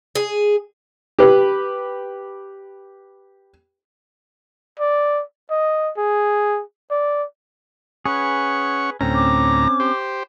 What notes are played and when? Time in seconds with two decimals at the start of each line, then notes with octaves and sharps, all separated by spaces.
0.16 G#4
1.19 G4 B4
4.79 D5
5.51 D#5
5.97 G#4
6.91 D5
8.06 C#4 G#4 B4 F#5 C#6
9.01 D2 A2 C4 C#4 A#5
9.15 D6
9.80 G4 C5